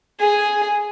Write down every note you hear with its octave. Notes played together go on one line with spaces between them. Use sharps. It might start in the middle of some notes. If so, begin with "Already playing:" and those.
G#4